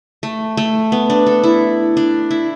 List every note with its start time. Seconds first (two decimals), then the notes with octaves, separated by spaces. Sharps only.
0.23 A3
0.57 A3
0.92 B3
1.10 D4
1.26 A4
1.44 E4
1.97 D4
2.31 E4